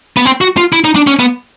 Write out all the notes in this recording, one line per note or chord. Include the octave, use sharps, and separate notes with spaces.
B3
C4
F#4
F4
E4
D#4
D4
C#4
B3